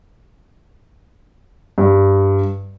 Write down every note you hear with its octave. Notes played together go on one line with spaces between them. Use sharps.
G2